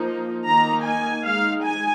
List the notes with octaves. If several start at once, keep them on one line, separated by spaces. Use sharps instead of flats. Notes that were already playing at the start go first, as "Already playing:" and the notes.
Already playing: F3 A#3 D#4
D#3 A#3 D#4 A#5
G#5
G#3 D#4 F5
G#5